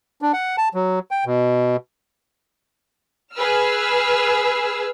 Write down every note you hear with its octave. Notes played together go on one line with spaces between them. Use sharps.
D4
F#5
A5
F#3
G5
B2
G#4 B4 E6 F6